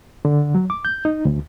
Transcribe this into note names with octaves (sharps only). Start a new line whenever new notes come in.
D3
F#3
D6
G6
D#4
D2